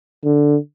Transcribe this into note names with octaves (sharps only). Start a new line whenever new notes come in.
D3